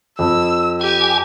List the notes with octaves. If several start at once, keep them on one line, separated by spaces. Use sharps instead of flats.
F2 E6
G4 G#5